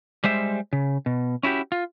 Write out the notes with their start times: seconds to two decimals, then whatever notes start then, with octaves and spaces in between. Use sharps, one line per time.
0.24 G3 G#3 C5 E5
0.73 C#3
1.06 B2
1.43 C#4 E4 F#4 G4
1.72 F4